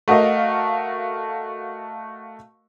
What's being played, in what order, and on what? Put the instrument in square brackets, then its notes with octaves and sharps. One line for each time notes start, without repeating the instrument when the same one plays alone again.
[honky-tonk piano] A3 F#4 A#4 D#5 F5